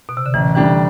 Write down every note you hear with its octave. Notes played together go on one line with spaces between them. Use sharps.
B2
C3
D3
A1 E3
A2 E3 G3 D4 G4